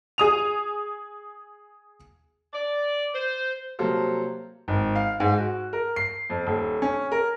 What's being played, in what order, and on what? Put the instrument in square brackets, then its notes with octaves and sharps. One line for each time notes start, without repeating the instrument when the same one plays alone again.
[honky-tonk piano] G#4 D#6 F7
[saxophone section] D5
C5
[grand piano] C3 F#3 G3 A#3 A4 C5
G#1
F5
G#2
F#4
A#4
C7
F2
D#1
C#4
A#4